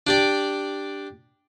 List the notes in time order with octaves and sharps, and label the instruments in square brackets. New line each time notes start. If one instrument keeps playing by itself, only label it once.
[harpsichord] D4 G4 D5